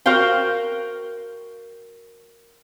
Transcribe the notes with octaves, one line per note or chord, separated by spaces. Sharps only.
F#4 A#4 C5 F5 G5